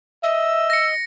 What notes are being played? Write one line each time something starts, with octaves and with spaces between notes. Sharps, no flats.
D#5 E5 E6
A#6 C#7